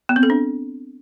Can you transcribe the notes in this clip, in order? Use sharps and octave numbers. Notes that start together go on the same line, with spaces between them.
B3
C4
A4
D4